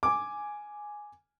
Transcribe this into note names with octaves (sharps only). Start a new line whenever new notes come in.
G#5 D6